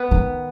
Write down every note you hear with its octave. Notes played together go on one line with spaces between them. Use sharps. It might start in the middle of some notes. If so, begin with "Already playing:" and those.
Already playing: B3
D#3